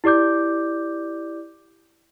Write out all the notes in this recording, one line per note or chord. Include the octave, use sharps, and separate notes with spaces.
E4 G4 D5 D6 G6